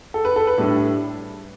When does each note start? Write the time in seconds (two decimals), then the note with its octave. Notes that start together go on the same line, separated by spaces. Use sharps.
0.14 A4
0.25 B4
0.36 A4
0.47 B4
0.58 A2 G3 D4 A4